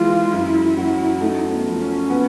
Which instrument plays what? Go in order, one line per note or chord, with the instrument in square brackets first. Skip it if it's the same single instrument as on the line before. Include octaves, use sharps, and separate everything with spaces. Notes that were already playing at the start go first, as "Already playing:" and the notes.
Already playing: [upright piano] E3 G#3 [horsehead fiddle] F4
[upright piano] F#2 [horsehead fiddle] E4
[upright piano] F#3
[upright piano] A3 [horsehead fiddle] D#4
[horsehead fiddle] B3
[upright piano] F3
[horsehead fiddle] C#4
[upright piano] B3